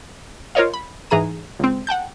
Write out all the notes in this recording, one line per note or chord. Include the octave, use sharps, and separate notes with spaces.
F4 A#4 C5 C#5 D#5 F5
B5
G#2 E3 G#4 A#5 D#7
C#2 C4
F#5 G5 A5 G6